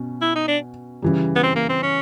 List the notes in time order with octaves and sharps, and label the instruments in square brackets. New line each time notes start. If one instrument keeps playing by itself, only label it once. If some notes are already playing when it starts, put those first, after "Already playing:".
Already playing: [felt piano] B2 C#4
[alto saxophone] E4
D#4
D4
[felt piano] C#3 E3 G3
[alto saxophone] B3
C4
A#3
C4
C#4